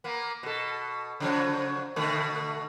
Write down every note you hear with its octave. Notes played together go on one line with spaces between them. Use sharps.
A#3 B3
B2 A4
C#3 F3 F#3
B2 D3 A3